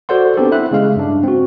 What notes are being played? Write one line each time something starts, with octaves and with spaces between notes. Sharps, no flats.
F#4 A4 C5 D5 F#5 C6
B3 C4 D4 G4 A4
E4 E5 F#6
C#3 G#3 F5
G2 D4
C4 F#4